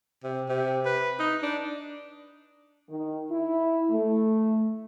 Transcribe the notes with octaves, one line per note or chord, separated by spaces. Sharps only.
C3
C3
B4
D#4
D4
D#3
E4
A3